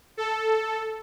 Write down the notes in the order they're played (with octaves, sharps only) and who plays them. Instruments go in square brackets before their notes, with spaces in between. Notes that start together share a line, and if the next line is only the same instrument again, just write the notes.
[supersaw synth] A4